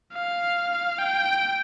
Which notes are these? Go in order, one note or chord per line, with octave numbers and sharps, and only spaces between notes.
F5
G5